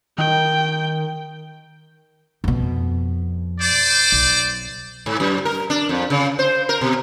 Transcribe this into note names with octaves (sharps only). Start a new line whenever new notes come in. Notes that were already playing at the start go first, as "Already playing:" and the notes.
D#3 G5
F2 B2
C5 D5
B1
G#2
F#2
A#4
D4
F2
C#3
C5
A#4
B2